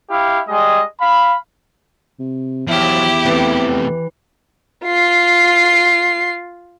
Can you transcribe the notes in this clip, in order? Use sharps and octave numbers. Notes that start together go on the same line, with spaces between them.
E4 G4 F5
G3 G#3 D#5
F5 B5
C3
E2 F3 F#3 E4 G4
C3 E3 A3
F4 C7